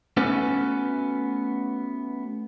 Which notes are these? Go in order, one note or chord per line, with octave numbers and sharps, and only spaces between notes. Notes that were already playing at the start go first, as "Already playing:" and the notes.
A3 B3 C#4 F#4 A4 B4